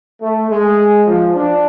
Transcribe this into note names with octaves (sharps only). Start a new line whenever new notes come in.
A3
G#3
F3
D4